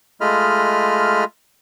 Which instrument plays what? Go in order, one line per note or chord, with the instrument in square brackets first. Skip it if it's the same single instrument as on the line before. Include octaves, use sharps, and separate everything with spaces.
[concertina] G#3 A3 F4 D#5 B5 F6